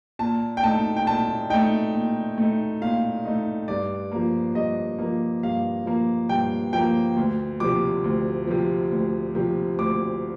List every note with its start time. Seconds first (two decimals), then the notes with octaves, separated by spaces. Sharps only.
0.19 A#2 A5
0.57 G5
0.63 A3 D#4 A5
0.97 G5
1.07 A#2 A5
1.50 A3 D#4 G5
1.93 A#2
2.38 A3 D#4
2.81 A#2 F5
3.25 A3 D#4
3.68 G2 D5
4.12 F3 A#3
4.55 G2 D#5
4.99 F3 A#3
5.43 G2 F5
5.86 F3 A#3
6.29 G2 G5
6.73 F3 A#3 G5
7.16 D2
7.60 C3 F3 D6
8.04 D2
8.47 C3 F3
8.91 D2
9.35 C3 F3
9.78 D2 D6